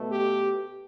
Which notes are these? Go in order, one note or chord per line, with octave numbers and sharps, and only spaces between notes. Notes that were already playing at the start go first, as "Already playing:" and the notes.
Already playing: B2 A3
G4